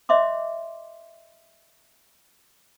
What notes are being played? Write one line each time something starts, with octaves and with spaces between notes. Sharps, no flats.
C#5 D#5 E5 C6 D6